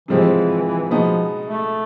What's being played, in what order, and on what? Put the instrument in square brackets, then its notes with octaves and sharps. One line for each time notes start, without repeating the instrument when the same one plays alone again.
[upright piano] C3 F3 G#3 C4 [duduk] E3
[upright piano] B2 G#3 B3 D#4 [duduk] F3
[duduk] A3